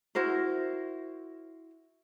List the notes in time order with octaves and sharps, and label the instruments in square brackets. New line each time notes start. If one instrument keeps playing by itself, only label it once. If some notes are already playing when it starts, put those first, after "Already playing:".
[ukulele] E4 F#4 A#4 C5